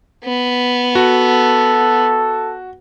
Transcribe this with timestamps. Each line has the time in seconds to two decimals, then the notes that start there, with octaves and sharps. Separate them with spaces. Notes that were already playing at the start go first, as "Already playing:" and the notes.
0.24 B3
0.95 F#4 A4